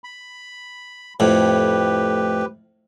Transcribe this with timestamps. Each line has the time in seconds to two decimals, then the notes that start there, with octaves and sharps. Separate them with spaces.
0.04 B5
1.20 F2 A2 G4 B4